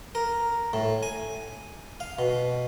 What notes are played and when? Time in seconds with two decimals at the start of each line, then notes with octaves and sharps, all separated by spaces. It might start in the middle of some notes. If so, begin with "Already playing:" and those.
0.15 A#4
0.73 A2
1.03 G#5
2.00 F5
2.19 B2